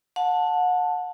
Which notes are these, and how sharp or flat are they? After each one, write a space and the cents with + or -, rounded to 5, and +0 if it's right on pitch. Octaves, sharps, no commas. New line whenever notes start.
F#5 -30 A5 +0